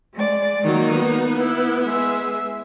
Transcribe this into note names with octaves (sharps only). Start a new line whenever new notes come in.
G#3 D5
D#3 F#3 A#3 D#4
B3
E4
G#3 E5